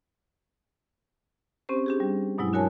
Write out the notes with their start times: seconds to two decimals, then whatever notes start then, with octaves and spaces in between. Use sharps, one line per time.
1.69 C4 C#4 G4 C5
1.86 D4 G4 G#4
2.00 G3
2.38 G2 B2 F#3 G#3 E4
2.53 D4 F#4 A#4 C#5 G#5 A5